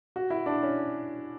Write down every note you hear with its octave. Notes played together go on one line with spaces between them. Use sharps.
F#4
E4
D4
C#4